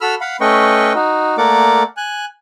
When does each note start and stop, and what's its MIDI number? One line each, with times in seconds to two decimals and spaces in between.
0.01 0.15 66
0.01 0.15 69
0.01 0.15 83
0.01 0.15 88
0.01 0.15 89
0.21 0.37 77
0.21 0.37 78
0.21 0.37 83
0.41 0.93 57
0.41 0.93 61
0.41 0.93 71
0.41 0.93 75
0.41 0.93 79
0.41 0.93 85
0.95 1.36 63
0.95 1.36 66
1.38 1.83 57
1.38 1.83 58
1.38 1.83 70
1.38 1.83 74
1.38 1.83 78
1.38 1.83 86
1.97 2.25 80
1.97 2.25 90